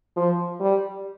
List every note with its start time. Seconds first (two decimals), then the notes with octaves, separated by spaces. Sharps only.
0.16 F3
0.60 G3